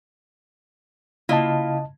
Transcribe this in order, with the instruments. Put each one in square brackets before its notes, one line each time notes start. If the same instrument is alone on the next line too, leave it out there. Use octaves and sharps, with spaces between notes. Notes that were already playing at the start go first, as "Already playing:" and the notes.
[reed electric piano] C#3 D#5 A5 [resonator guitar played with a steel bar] A#3 E4 F4